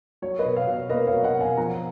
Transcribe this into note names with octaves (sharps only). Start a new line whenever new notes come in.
F#3 C#5
B4 D#5
B2
C#5 F5
B2
C#5
A#3 B4 D#5
C#5 F5
F#3
D#5 F#5
B2
F5 G#5
F3 F#5 A#5